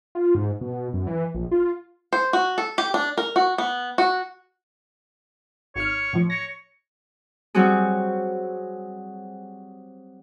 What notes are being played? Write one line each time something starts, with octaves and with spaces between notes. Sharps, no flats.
F4
G#2
B2
F#2
E3
A#1
F4
C5
F#4
A4
G4
D4
A#4
F#4
B3
F#4
G#1 C#5 F6
A2 F3
C#5 A#6
F#3 G3 C4 F#4 G#4